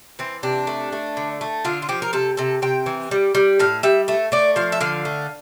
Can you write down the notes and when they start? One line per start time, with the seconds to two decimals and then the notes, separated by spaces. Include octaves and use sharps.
0.19 E3 C4
0.43 C3 D4
0.67 A3
0.92 A3
1.17 D3
1.41 A3
1.65 D3 F4
1.82 F4
1.89 F3 G4
2.02 A#4
2.13 C3 A4
2.37 C3 A4
2.62 C3 G5
2.86 E3
3.11 G3
3.35 G3
3.59 A2 F5
3.83 G3 E5
4.08 A3 E5
4.32 A3 D5
4.56 F3 F5
4.72 E5
4.81 D3 F5
5.05 A3